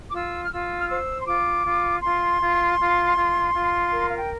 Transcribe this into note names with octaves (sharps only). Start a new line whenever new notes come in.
D6
F4 E6
F6
F4 E6
F6
C5 E6
C6
F4 D6
F4
F4 C6
F4
F4
F4
F4
A#4
F5
G5